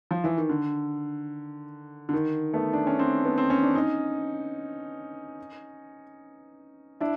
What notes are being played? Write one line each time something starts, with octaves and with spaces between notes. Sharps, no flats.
F3
E3
D#3
D3
D3
D#3
A3 B3
D4
C#4
C4 D4
B3
C4
C#4
D4
C#4 D#4
D4 E4